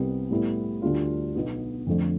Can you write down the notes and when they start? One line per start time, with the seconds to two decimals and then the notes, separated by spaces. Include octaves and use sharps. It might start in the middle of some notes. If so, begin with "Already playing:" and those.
Already playing: C2 C3 G3 B3
0.30 A2 G3 B3 E4
0.82 D2 D3 G3 D4 F4
1.35 B1 B2 B3
1.87 F2 D3 F3 A3